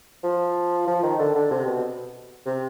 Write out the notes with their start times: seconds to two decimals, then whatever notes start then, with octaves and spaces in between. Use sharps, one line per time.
0.24 F3
0.87 F3
1.03 D#3
1.19 D3
1.35 D3
1.51 C3
1.66 B2
2.46 C3